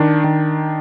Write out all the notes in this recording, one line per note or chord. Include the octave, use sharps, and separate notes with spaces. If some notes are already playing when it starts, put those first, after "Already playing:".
Already playing: D#3 D4
D#3